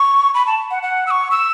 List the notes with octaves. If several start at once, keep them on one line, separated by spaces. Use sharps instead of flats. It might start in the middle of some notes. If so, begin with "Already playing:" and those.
Already playing: C#6
B5
A5
F#5
F#5
E6
C#6
E6